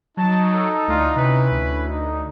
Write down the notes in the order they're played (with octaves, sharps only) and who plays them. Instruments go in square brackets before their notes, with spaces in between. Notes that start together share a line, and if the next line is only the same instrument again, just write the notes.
[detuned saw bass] F#3 [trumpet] D#4 [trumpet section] A5
[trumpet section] A4
[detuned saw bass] D2 [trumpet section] D4 E4 F4
[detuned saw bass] C3 [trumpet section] C#4 E4 B4
[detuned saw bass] D2
[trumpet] D#4